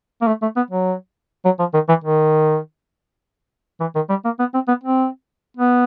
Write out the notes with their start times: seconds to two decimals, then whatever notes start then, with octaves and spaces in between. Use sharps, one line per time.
0.22 A#3
0.28 A3
0.42 A3
0.56 B3
0.71 F#3
1.45 F#3
1.59 F3
1.74 D#3
1.89 E3
2.04 D#3
3.81 E3
3.95 D#3
4.10 G3
4.25 A#3
4.39 B3
4.54 C4
4.68 B3
4.84 C4
5.57 B3